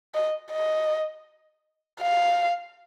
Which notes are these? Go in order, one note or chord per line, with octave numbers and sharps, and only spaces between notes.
D#5
D#5
F5